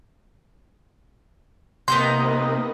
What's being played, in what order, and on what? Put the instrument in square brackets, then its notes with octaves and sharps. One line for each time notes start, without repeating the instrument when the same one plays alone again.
[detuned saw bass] C3 [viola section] A#3 B4 D#5 [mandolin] B3 D#4 G6 [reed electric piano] C6